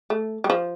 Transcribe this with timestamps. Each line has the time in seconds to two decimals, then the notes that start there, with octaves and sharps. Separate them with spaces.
0.10 A3
0.44 G3
0.50 F3